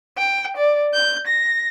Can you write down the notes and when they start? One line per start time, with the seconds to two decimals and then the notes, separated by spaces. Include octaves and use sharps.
0.18 G5
0.57 D5
0.94 G6
1.27 A#6